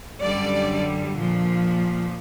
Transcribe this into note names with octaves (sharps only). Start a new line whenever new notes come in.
F#2 D3 G3 D5
A#2 F3